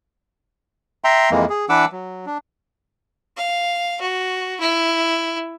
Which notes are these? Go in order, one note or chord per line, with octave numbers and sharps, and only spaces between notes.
E5 G5 A#5 C6
F2 E3 G#3 A#3
G#4
E3 D4 B4 F#5 D6 E6
F#3
D4
F5
F#4
E4